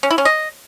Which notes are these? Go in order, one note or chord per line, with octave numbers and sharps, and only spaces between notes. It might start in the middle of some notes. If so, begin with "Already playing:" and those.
C#4
E4
C#4
D#5